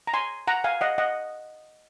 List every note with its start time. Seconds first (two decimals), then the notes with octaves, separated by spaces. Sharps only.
0.07 A#5
0.14 G#5 C6
0.47 F#5 A#5
0.64 F5 G#5
0.81 D#5 F#5
0.98 D#5 F#5